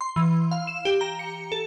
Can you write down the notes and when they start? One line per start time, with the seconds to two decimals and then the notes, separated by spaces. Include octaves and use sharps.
0.01 C6
0.16 E3
0.51 F5
0.67 E7
0.85 G4
1.01 A#5
1.19 C#7
1.52 A4